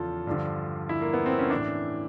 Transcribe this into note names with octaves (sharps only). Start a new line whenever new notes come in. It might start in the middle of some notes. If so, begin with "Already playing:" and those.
Already playing: E2 C#3 F3 F4 A4
G2 D3 F3
E4
A#3
B3
C4
C#4
A2 E3 D4